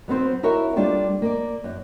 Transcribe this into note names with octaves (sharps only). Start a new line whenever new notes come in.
F#3 B3 C4 C5
E4 F#4 A#4 C#5 E5
G3 A#3 D4 F4 G4 A4
A#3 D5
F#2